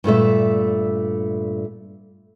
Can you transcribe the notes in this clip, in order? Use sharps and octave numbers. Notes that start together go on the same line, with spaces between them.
G2 A#2 A3 E5